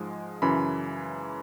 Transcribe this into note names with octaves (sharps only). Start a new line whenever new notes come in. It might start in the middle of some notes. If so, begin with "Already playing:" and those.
Already playing: G#2 F3 G#3
F#2 C#3 E3 B5